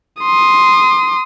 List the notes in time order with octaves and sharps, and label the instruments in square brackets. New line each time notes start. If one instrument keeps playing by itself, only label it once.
[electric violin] C6 D#6